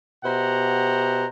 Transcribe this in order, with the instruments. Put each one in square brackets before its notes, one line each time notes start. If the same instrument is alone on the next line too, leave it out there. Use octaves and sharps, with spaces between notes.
[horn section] B2 G4 C5 E5 F#5 A#5